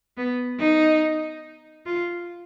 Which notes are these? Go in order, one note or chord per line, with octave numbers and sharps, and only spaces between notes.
B3
D#4
F4